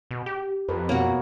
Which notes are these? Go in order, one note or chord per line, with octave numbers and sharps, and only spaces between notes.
B2
G4
F2 A#4 B4
B2 A#3 B3 F#4 C#5